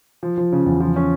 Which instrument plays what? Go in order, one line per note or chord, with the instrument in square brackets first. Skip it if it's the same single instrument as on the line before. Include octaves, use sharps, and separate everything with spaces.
[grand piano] F3
F3
C#3
E2
F3
C#4